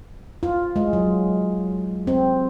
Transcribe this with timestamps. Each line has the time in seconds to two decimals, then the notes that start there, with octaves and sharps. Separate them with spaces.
0.43 F4
0.76 G#3
0.93 F#3
2.07 C4